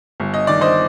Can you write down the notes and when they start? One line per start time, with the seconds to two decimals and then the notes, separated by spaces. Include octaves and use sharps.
0.20 G1
0.34 D#5
0.47 D#3 D5
0.61 C5 D#5